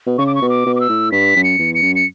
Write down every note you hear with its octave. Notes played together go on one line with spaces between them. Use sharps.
B2
C#3 C#6
D6
C#6
B2
D6
B2
D6
E6
A2
G2 B6
F#2
C#7
E2
C#7
F#2
C#7